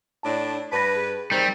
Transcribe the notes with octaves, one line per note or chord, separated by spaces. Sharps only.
A2 D4 C#5 A5
G2 B4 A5 B5 A#6
G#4
D#3 G3 C4